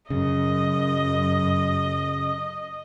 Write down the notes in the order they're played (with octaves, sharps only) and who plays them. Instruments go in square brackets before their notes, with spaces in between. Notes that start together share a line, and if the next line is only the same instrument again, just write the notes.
[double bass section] F#2 [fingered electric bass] C#3 [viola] D#5